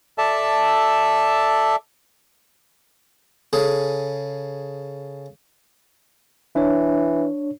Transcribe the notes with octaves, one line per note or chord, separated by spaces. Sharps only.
A4 D5 E5 A5
C#3 G#4 A4
E3 D4 C#5